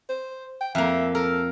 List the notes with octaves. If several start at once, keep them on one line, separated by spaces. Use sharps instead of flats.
C5
G5
F2 A#3 E5
A4 A#4